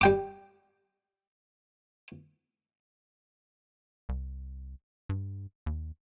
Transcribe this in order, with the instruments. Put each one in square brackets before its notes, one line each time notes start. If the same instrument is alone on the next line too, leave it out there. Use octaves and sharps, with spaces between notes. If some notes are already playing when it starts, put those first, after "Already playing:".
[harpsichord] G3 G5 D6
[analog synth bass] C2
G2
D#2